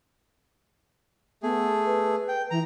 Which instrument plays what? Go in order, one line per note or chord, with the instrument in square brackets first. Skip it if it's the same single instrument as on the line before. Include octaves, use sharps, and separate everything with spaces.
[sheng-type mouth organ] A3 G#4 [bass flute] B3
[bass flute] B4
[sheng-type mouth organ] G5
[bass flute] E3 [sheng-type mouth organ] A#5